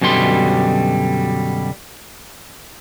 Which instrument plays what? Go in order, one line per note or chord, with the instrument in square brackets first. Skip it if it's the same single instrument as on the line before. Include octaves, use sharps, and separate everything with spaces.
[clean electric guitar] F#2 B2 D3 G3 C6